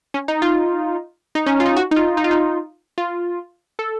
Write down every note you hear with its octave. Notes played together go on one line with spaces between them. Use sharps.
C#4
D#4
F4
D#4
C#4
F4
D#4
F#4
D#4
F4
D#4
F4
D#4
F4
A4